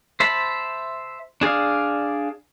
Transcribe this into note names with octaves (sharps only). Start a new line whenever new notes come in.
C5 E5 A5 B5
D4 G#4 D5 F5